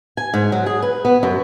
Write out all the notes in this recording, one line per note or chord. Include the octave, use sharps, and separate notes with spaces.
G#5
G#2
F#3
G#4
B4
B3
F#2